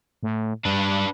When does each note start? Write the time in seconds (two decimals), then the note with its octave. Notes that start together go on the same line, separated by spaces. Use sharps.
0.23 A2
0.65 G2 D4 B4